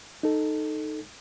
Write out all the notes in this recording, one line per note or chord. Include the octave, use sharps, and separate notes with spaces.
D#4 A4